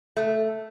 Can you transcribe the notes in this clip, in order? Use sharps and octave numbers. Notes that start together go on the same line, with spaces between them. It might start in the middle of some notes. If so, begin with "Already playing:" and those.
A3